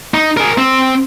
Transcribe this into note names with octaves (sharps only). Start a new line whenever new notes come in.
D#4
G#4 A#4
C4